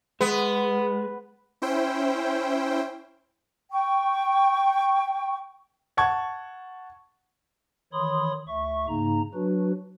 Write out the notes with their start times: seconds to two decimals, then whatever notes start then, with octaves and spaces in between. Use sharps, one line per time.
0.21 G#3 B3
1.62 C#4 E4 C5 G5
3.71 G5 C#6
5.97 F#5 A5 C#6 G#6
7.93 D#3 E3 C#5 B5 C6 D#6
8.48 D2 E5 C#6
8.88 G#2 C#3 A#3 D#4 A#5
9.34 F#3 D4 F#4 B4